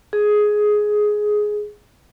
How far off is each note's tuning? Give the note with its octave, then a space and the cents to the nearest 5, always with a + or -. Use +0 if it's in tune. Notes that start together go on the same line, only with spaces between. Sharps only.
G#4 +10